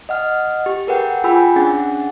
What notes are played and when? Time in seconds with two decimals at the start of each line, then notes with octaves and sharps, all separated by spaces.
0.09 D#5 F#5 F6
0.66 G4
0.87 G#4 A#4 B4 F#5 G5
1.24 F4 G#4 G5 G#5 B5 E6
1.56 C#4 D4 G#4 F#5 A6